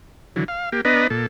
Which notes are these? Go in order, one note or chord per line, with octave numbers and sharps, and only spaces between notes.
D3 E3 F#3
F5
A#3 G4
B3 D4 B4 D#5 A#5
A#2 A4